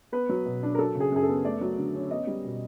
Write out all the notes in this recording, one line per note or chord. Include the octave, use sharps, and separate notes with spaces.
B3 B4
F#3
B2
D4
A#4
F#3 A4
C#3
G#4
F#2 G#4
A4
B3
A3 D5
F#3
D3
C#4
B3 D#5
G3
B2